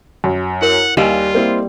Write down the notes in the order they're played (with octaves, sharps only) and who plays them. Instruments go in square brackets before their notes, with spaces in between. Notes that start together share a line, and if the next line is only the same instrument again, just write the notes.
[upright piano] F#2
[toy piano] E4 A#4 C#5 [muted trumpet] F#5
[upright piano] D#2 G#5 [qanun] G3 [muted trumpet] F4 [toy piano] D#5 F5 E6
[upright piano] A#3 C4 E4